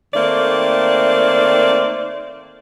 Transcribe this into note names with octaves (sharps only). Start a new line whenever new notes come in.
D#3 A3 A#3 C4 D5